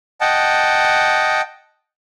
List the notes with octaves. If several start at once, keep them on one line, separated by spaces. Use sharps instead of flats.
D#5 F#5 G5 A5